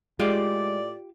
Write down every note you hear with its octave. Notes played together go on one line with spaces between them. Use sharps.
A2 G#3 F4 G4 D5 F5